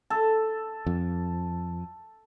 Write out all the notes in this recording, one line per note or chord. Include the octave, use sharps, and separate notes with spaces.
A4
F2